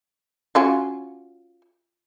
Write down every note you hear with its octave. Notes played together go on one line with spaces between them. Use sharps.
C#4 F4 F#4